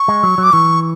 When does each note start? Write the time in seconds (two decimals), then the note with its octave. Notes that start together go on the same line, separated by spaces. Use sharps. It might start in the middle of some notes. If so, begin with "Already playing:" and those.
Already playing: C#6
0.08 G#3
0.23 F#3
0.38 F#3
0.43 D6
0.53 E3 C#6